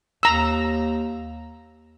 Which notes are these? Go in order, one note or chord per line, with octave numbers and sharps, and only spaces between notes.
D#2 A#5 E6